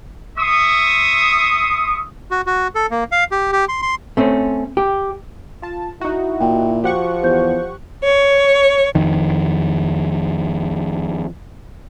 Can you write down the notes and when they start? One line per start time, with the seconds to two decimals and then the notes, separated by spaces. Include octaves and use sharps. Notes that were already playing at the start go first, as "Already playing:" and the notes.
0.38 E5 C6 C#6 D#6
2.31 F#4
2.46 F#4
2.75 A4
2.91 A#3
3.12 F5
3.31 G4
3.52 G4
3.68 C6
3.82 C6
4.17 A3 C4 C#4
4.77 G4
5.62 F4 A5
6.01 D#4 E4 F#4
6.41 A#2 G5
6.84 F3 F#4 G4 F#5 C#6
7.23 E2 C5 G6
8.03 C#5
8.95 F2 D#3